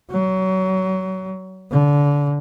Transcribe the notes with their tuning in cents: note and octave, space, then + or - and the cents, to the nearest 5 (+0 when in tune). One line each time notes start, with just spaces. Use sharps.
F#3 +25
D3 -25